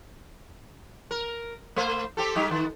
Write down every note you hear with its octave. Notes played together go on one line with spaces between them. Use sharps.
A#4
A3 C5
C4 G4 A4
G3 D#4 G4
D#3